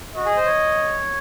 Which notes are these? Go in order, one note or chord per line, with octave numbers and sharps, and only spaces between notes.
F#4 D#5
G#4
C5
C#5